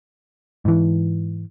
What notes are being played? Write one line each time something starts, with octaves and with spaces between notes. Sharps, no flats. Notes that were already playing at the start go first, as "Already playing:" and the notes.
G#2 E3